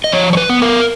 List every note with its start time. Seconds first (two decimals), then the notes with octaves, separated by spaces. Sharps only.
0.04 D#5
0.12 F3 C#5
0.33 C#5
0.37 B4
0.49 B3
0.62 A#4